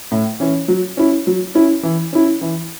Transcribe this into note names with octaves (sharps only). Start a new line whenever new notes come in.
A2
E3 C#4
F#3
C#4 E4
F#3
C#4 E4
E3
C#4 E4
E3